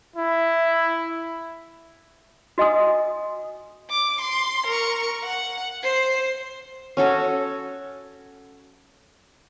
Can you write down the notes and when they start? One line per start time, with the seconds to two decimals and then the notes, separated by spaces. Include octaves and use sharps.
0.16 E4
2.58 F#4 D#5 G#5 D#6
3.90 D6
4.21 C6
4.67 A#4 C#6
5.24 F#5
5.83 C5 C7
6.97 C#4 F#4 A4